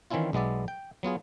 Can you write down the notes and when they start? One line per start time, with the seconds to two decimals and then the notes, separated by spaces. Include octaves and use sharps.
0.10 D#3 E3 C4 C#4 E4 F4
0.33 B1 G#3 B3 D5 E5
0.68 G5
1.03 F#3 B3 F4 G#4